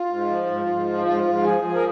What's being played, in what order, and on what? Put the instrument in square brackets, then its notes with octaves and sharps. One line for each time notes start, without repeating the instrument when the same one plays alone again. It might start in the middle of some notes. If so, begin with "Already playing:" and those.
Already playing: [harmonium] F4
G#2
F3
G#2
G#2
F3
G#2 F4
G#2
F3 G#4
F3
A#4